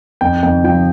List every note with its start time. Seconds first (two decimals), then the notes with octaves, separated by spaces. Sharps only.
0.21 F2 G5
0.43 F2 G5
0.64 F3 G5